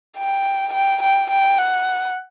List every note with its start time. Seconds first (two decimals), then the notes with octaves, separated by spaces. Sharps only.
0.17 G5
0.74 G5
1.03 G5
1.31 G5
1.59 F#5